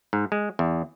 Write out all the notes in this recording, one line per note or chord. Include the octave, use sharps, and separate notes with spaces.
G#2
G#3
E2